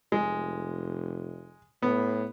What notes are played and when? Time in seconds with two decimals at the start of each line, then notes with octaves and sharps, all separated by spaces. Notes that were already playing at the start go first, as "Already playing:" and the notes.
0.12 F1 G#3
1.82 A2 B3